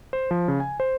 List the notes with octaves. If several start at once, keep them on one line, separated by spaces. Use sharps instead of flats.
C5
F3
C#3
G#5
C5